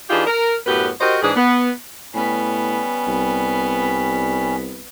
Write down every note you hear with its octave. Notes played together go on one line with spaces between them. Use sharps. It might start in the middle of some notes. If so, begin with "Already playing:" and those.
E3 D4 D#4 F4 G4 G#4
A#4
F#2 A2 B3 G4 B4
F#4 G4 A#4 C5 D#5
G#2 E3 D4 G#4
B3
A2 G3 B3 C#4
C2